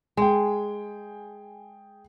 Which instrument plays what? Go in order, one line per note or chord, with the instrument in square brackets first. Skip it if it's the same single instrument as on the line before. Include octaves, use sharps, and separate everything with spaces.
[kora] G#3 [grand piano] G#4 G5